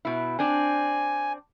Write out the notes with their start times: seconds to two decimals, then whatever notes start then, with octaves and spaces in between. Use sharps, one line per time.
0.05 B2 E4
0.39 C4 D4 G#5